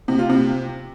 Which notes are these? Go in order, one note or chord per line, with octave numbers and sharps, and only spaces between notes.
C3
F4
C3